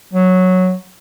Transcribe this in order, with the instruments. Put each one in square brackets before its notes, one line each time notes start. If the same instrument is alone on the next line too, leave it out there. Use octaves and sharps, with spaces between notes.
[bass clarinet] F#3